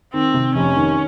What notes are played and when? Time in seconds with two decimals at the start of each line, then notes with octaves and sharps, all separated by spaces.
0.14 D#3 C4
0.34 C3
0.55 F1 C#4
0.76 D#3